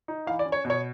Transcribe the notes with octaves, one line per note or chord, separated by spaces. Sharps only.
D#4
E3 F5
D5
C#4
C#5
B2
C#5